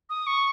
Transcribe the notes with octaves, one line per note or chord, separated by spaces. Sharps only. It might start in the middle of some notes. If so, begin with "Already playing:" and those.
D#6
C#6